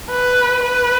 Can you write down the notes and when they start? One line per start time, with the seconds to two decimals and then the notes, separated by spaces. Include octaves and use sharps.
0.11 B4
0.63 B4